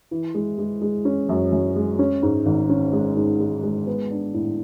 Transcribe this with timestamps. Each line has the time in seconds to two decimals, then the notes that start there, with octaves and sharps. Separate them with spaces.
0.11 E3
0.34 G#3
0.58 G#3
0.81 G#3
1.05 C#4
1.29 F#2
1.52 F#2
1.76 G#3
1.99 C#4
2.23 G#2
2.46 G#1
2.69 C#4
2.93 G#3
3.16 G#2
3.40 G#3
3.63 G#3
3.87 B3
4.10 D4
4.34 A2